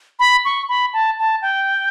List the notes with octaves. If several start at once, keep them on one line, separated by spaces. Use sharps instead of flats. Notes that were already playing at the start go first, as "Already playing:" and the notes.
B5
C#6
B5
A5
A5
G5